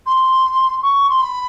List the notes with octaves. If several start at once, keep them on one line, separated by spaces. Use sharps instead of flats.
C6
C#6
C6
B5